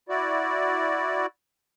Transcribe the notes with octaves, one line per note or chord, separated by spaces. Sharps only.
E4 F#4 D5